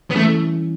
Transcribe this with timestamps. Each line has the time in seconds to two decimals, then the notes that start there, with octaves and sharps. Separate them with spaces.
0.11 B3
0.15 E3 G3 A3 C#4 E4